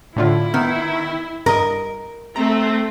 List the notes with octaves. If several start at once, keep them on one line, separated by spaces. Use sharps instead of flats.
A2 D3 E4 F4
D#3 B3
G2 A#4 D#5
A3 C4 A#5